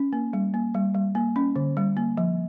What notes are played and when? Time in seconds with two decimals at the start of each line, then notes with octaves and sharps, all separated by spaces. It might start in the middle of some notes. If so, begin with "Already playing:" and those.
Already playing: C#4
0.13 A#3
0.33 G3
0.54 A#3
0.74 G3
0.94 G3
1.15 A#3
1.36 C#4
1.56 D3
1.77 G3
1.97 A#3
2.17 F3